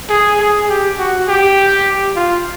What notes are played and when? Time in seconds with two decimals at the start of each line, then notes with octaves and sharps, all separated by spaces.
0.10 G#4
0.40 G#4
0.69 G4
0.98 F#4
1.28 G4
2.16 F4